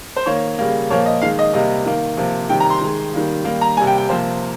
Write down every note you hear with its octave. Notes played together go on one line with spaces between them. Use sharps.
C5
D#3 A#3 C#5
C#3 G3 A#3
A#2 F3 A#3 C#5
D#5
D#3 G#3 F5
D#5
C3 G3 A#3 D#5
D#3 A#3
C3 F3 A#3
C3 D#3 G3 G5
A#5
C6
D#3 G#3
D#3 G3 A#3
D#3 G3 A#3
A#5
C3 G3 A#3 G#5
G5
G5
C3 F3 A#3 C5